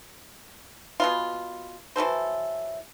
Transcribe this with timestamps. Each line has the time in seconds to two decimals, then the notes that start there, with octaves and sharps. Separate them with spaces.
1.00 B2 B3 F4
1.96 E3 F#3 A4 C5